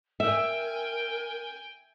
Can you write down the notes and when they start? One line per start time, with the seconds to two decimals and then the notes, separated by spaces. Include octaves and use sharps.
0.20 A#4 E5 G5 G#5